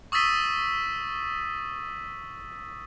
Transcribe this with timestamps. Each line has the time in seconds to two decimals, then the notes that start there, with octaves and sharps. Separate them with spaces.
0.12 C#6 D#6 E6 A6 B6 D#7